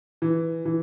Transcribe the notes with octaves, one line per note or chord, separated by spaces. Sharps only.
E3
E3